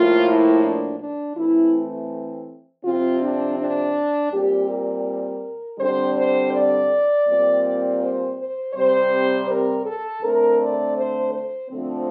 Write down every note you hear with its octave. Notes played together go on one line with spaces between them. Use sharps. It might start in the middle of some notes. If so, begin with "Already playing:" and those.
Already playing: A2 F3 A#3 F4
E4
D4
D4
E3 A3 C4 E4
C3 F3 C4 F4
D4
D4
A#2 G3 C4 G4
A#4
D3 G3 C4 C5
C5
D5
A#2 G3 C4
C5
C5
C3 G3 C4 C5
A#4
A4
D3 A3 C4 A#4
D5
C5
C5
D3 F3 A3 C4